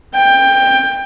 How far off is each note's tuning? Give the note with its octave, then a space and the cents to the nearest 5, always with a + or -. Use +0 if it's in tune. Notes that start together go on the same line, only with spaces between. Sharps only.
G5 +15